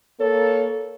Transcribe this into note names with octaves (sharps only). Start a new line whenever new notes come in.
A#3 A4 C#5